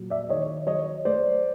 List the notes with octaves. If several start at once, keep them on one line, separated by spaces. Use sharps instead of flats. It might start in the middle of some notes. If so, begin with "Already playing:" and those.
Already playing: A#2 F#3
D5 E5
D#3 C#5 D#5
F#3 C#5 D#5
A3 C5 D5